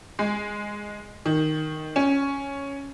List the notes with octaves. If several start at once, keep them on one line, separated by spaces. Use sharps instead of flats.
G#3
D#3
C#4